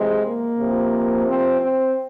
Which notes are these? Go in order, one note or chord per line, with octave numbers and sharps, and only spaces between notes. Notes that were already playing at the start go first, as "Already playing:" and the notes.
Already playing: C3 E3 G#3
A#3
C3 F3
C4
C4